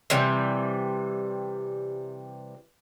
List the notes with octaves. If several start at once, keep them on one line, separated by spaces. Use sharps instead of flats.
C3 E3 G3